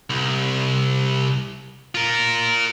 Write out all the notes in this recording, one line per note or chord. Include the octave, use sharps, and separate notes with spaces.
C2
F4 A#4